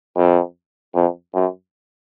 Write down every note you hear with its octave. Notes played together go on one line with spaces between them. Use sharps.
F2
F2
F#2